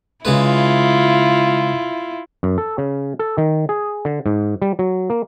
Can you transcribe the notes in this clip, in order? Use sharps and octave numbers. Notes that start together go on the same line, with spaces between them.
C#3 G#3 E4 F4 B4
F#2
A4
C#3
A4
D#3
G#4
D3
G#2
G3
F#3
A#3